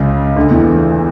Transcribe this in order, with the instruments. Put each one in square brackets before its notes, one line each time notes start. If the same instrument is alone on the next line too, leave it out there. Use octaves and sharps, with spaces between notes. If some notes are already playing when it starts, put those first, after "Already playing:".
Already playing: [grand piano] C#2 C#3
D2 D3
E2 E3